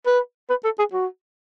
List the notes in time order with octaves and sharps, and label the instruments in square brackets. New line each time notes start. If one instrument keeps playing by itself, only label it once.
[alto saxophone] B4
B4
A4
G#4
F#4